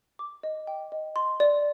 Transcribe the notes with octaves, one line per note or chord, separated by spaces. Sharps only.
D6
D#5
G5
D#5
C6
D5